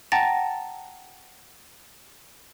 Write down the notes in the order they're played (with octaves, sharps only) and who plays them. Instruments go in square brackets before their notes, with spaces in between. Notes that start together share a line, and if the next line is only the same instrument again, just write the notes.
[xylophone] F#5 G5 A5 A#5 A6 A#6